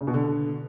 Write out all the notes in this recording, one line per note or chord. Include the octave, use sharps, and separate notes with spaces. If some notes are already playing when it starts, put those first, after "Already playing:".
C#3
B2
D3